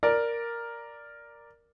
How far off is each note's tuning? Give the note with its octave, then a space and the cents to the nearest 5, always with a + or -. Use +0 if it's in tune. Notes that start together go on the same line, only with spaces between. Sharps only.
A#4 +0 D5 +0